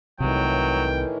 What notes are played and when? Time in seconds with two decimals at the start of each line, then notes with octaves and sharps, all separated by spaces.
0.20 C2 A2 C3 D#3 E3 F#3 G5